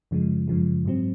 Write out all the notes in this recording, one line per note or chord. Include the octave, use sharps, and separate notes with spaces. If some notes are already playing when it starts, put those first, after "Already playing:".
F#2 C#3 F3 G#3
F#2 C#3 F3 G#3
G#2 F#3 C4